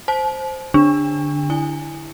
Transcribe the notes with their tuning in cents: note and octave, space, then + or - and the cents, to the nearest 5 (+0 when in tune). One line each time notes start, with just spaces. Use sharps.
C5 +0 A5 -40
D3 +0 D4 +0
E4 -5 G#5 -10